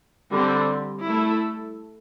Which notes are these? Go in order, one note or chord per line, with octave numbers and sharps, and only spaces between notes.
D3 G3 C4
A3 E4 A4